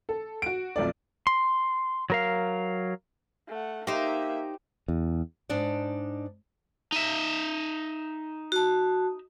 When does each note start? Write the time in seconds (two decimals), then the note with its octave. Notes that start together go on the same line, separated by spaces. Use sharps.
0.09 A4
0.42 F#4 D7
0.76 B1 F2 A3 D5
1.27 C6
2.10 F#3 A#4 F5
3.48 A3 F#5
3.87 A#3 D#4 G4 C5 E5
4.88 E2
5.49 G#2 D4 D#4 D5
6.92 D#4 E5
8.52 F#4 A5